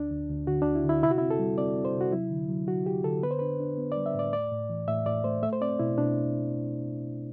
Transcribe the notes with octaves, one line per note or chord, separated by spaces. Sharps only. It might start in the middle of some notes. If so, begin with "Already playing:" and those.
Already playing: D2 D4
D2
D2
D3 F#4
D4
D2
E4
D3
E4
C3 E4
F#4
E4
C4
A4
G3
C4 D5
C4
C5
C3
F#4
F#3 E4
D3
F#3
F#3 F#4
F#3 G4
D3 A4
B3 B4
C5
D4 B4
D4
B3
D5
G3
E5
A2 D5
A3 D5
A2
E3
A2 E5
A2 D5
A3 C5
A3 E5
C5
C4 D5
B2 E4
B2 D4